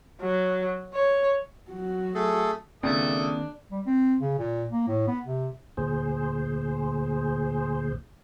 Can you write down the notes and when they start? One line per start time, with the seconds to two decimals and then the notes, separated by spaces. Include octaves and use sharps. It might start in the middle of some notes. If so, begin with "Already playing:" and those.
0.21 F#3
0.94 C#5
1.70 F#3 F#4
2.14 A3 G#4 A4
2.83 C#2 D#3 A#3 C4 D4 A4 E5 D#6
3.71 G3
3.86 C4
4.20 C#3
4.39 A#2
4.70 A#3
4.87 A2
5.07 B3
5.25 C3
5.77 D2 A#2 G#4 C5